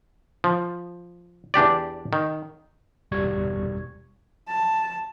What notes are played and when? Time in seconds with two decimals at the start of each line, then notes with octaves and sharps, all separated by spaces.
0.44 F3
1.54 E2 D4 G4 D5
2.13 D#3
3.11 G1 E2 B2 G3 C#6 G#6
4.48 A5